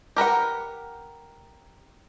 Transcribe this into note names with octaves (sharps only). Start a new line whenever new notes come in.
G4 A#4 B4 F#5